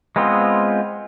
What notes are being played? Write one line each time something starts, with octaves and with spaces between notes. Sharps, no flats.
G#3 B3 C4 F4